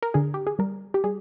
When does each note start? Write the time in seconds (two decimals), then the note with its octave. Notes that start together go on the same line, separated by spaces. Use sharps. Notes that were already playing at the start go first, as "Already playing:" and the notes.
0.02 A#4
0.14 D3 G#4
0.34 G4
0.47 G#4
0.59 G3 A#4
0.94 G4
1.04 G3 G#4